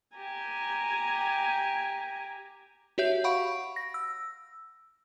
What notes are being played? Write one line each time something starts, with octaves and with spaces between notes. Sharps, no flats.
G4 G#5 A#5
F#4 G4 C#5 E5 G6
F5 F#5 B5 C#6 D7
A#6
E6